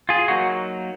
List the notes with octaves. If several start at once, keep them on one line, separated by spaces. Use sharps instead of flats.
F4 G#4
F#3 A#3 D#4 F#4